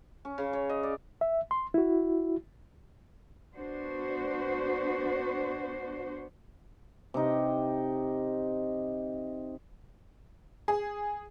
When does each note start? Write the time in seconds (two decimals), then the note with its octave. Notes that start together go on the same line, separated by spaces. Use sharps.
0.25 C#4
0.38 C#3
0.53 C#5
0.69 D#5
0.83 D5
1.21 E5
1.51 C6
1.74 E4 F#4
3.56 B3 D4 F#4 C5
7.14 C3 D#4
10.68 G#4